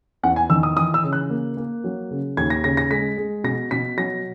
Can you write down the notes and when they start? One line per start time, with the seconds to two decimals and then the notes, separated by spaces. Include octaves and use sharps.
0.23 E2 F#5
0.36 G#5
0.50 D#3 E6
0.63 D#6
0.77 E3 D#6
0.94 E6
1.04 C#3
1.13 F#6
1.30 A#3
1.57 A#3
1.84 F#3
2.11 C#3
2.37 D#2 G#6
2.50 A#6
2.64 C#3 A#6
2.77 A#6
2.91 G#3 B6
3.18 G#3
3.44 B2 A#6
3.71 B2 B6
3.97 F#3 A#6